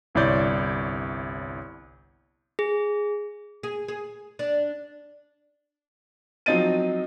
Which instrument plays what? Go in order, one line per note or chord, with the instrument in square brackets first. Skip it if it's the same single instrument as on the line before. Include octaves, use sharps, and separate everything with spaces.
[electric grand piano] G1 C2 E4 C#5 D5 G6
[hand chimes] G#4
[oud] G#4
G#4
D4
[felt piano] F3 F#3 C4 D#4 A6 D#7